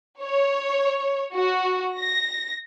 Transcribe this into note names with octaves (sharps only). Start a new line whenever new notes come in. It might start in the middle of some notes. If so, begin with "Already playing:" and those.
C#5
F#4
A#6